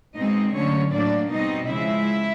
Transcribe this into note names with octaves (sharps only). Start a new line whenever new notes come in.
B2 G#3 C4 D#4 D#5
D3 F#3 A3 C#4 C#5
A2 F#3 A#3 D4 D5
B2 G3 C4 D#4 D#5
C#3 F3 G#3 E4 E5